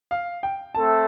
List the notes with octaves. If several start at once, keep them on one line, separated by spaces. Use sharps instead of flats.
F5
G5
A3 C4 A4 A5